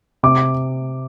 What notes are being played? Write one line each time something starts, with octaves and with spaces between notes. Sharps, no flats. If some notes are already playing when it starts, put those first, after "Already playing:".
C3 D6